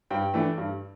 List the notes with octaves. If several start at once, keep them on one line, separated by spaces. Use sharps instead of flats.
G2 G5
E3 A3 D4
G2